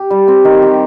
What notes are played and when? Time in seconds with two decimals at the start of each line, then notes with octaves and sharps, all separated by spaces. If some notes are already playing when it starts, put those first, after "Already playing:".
Already playing: G4
0.10 G3
0.28 C4
0.45 D#3
0.62 G4